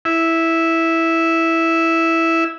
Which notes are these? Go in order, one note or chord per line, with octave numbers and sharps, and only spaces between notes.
E4 E5